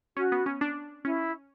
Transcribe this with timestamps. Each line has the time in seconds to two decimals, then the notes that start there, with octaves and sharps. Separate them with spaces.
0.17 C#4 F#4
0.32 B3
0.46 C#4
0.61 D4
1.05 C#4 E4